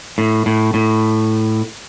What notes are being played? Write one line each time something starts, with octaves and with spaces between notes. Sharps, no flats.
A2
A2
A2